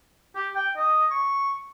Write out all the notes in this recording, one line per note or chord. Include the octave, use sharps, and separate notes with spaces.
G4
G5
D#5
C#6